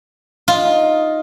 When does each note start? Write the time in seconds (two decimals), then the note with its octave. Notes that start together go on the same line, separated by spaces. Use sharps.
0.48 F4 D#5
0.65 D#4